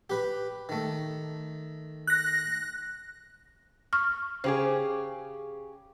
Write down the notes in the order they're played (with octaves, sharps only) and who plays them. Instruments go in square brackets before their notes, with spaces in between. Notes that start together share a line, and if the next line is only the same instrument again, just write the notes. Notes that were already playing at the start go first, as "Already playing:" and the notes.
[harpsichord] G4 B4
D#3 A3
[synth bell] F#6 A#6
[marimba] C#6 F6
[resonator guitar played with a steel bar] C#3 G4 G#4 [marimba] C5